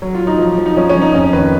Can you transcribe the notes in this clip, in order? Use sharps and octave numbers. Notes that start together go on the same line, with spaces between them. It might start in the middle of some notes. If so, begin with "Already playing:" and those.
F#3
F4
F#3
D#4
F3
F3
D#4
F3 C#4
C#4
F3
D#4
F2 C#4
D#3 B4